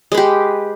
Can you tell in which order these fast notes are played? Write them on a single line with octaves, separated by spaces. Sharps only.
G#3 B4 G4